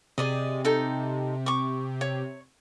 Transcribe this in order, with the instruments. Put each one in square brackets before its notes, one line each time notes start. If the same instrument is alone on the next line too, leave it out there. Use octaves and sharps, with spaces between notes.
[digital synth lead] C3 [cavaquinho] G#4 D5 D#5
[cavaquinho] D#4 A4 G5
C#6 D6
C#5